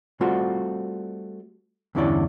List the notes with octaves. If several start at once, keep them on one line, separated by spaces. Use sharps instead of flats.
G3 A3 C4 F4 F#4
E2 G2 D3 C#4 E4 D5